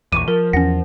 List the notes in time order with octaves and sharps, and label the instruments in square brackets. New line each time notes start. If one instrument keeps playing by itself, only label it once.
[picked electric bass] A#1 E2 [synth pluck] C#6 D6 [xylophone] D#7
[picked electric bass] F3 [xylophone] A#4
[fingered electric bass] E2 [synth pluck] C#4 A#6 [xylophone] F#5